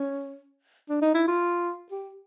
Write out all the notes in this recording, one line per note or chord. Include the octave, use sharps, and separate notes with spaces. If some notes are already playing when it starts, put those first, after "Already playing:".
Already playing: C#4
D4
D#4
E4
F4
G4